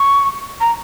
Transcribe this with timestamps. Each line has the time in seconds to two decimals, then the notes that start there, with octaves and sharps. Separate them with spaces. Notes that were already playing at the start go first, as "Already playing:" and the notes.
Already playing: C#6
0.61 A#5